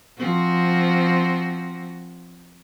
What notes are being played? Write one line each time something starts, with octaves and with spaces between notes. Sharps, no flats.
F3 C4 F#4